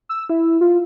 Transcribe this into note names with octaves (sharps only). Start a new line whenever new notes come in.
E6
E4
F4